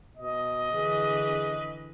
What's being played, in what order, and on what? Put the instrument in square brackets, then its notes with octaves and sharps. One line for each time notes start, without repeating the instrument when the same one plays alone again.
[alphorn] B2 [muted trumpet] D#5
[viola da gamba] D3 E3 B4 [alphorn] G#4